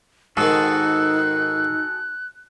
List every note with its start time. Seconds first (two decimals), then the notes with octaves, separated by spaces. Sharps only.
0.37 G#2 D#3 D#4 F#4 G#4 A4 F#6